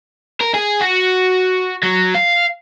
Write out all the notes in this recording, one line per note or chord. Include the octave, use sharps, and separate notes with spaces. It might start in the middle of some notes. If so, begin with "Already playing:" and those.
A#4
G#4
F#4
F#3
F5